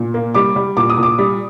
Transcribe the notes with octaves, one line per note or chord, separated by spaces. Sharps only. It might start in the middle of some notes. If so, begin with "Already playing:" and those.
Already playing: A#2
A#3
G3 D6
G3
A#2 D6
D#6
A#2 D6
G3